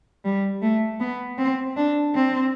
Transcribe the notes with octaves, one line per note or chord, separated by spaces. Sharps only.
G3
A3
B3
C4
D4
C4